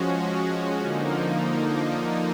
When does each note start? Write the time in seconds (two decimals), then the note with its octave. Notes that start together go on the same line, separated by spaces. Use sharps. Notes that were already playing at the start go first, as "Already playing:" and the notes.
Already playing: F3 G#3 C#4 F#4
0.82 D3 F3 A#3 D#4